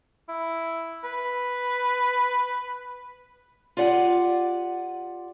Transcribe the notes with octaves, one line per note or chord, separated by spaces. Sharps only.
E4
B4
F4 G4 D5 F#5 G#5